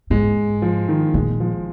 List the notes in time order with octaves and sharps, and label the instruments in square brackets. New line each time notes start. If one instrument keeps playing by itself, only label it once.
[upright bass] G#2 [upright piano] G#3
[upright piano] F3
D#3
[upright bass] A#2 [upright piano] G#3
[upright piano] F3